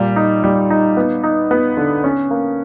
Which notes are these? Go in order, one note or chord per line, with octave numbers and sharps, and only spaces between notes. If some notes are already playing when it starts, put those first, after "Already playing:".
Already playing: A#2 G3
D#4
G3
D#4
B3
D#4
B3
D3
C#4
A#3